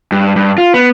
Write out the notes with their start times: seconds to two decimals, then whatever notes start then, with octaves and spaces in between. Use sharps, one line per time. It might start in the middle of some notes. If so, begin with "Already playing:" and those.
0.12 G2
0.36 G2
0.58 F4
0.74 B3